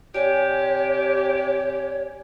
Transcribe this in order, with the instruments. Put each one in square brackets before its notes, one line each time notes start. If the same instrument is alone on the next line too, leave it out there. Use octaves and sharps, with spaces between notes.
[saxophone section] C3 G4 [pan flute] C#5 [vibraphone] D5 G#5